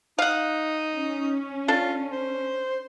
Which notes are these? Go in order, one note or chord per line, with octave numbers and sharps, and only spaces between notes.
D#4 F5 F#5
C#4
D4 F4 A4
C5